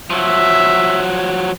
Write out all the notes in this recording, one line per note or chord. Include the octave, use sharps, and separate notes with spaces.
F3 F#3 E5